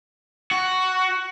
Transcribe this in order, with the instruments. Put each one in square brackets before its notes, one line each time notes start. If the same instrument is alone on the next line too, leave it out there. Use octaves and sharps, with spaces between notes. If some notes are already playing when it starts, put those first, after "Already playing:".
[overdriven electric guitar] F#4